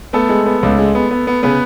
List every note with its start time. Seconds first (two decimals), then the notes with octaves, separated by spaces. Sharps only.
0.13 A3 B3 A4
0.29 G#3
0.46 B3
0.63 C#2
0.79 G#3
0.95 B3
1.11 B3
1.27 B3
1.43 C#3 B3 B4